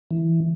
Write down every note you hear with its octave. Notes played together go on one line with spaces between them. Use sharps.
E3